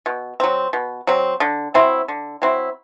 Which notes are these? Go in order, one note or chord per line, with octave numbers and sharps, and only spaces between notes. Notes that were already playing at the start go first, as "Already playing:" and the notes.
B2
F#3 C4
B2
F#3 C4
D3
F#3 C4 E4
D3
F#3 C4 E4